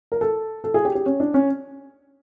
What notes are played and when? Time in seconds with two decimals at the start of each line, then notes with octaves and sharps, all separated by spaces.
0.12 A#4
0.21 A4
0.64 A4
0.74 G#4
0.85 G4
0.95 G4
1.06 C#4
1.20 D4
1.34 C#4